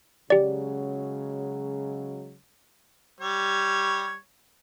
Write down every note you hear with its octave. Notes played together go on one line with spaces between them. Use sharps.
C#3 F#3 G#3 G4 D5
G3 C#5